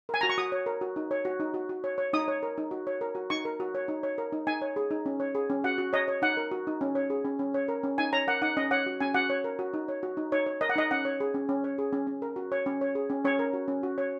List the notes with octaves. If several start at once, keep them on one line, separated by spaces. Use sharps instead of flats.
A#4 G#5
F#4 A#5
C#6
F#4 D#6
C#5
A#4
F#4
D#4
C#5
F#4
D#4
F#4
F#4
C#5
C#5
D#4 D#6
C#5
A#4
D#4
F#4
C#5
A#4
F#4
D#4 C#6
A#4
F#4
C#5
D#4
C#5
A#4
D#4
D#4 G#5
C#5
G#4
D#4
C#4
C#5
G#4
C#4
F#4 F#5
F#4
C#5 D#5
C#5
D#4 F#5
A#4
F#4
D#4
C#4
C#5
G#4
C#4
C#4
C#5
A#4
C#4
D#4 G#5
C#5 A#5
A#4 F#5
D#4 F#5
C#4 D#5
C#5 F#5
F#4
C#4 G#5
F#4 F#5
C#5
A#4
F#4
D#4
C#5
F#4
D#4
D#4 C#5
C#5
A#4 D#5
F#5
D#4 D#5
C#4 F#5
C#5
G#4
C#4
C#4
C#5
G#4
C#4
C#4
A#4
F#4
C#5
C#4
C#5
G#4
C#4
C#4 C#5
A#4
F#4
C#4
F#4
C#5